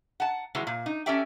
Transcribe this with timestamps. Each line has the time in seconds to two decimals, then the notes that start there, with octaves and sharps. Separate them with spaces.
0.20 F#5 A5
0.55 D#3 E3 F#3 G#3
0.67 A#2
0.86 D#4
1.06 C#4 G4 A4 D5 E5 G5